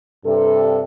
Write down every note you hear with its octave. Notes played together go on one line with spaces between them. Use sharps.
G2 C3 A4